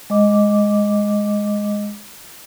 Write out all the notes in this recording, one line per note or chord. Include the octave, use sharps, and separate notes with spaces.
G#3 D#5 D6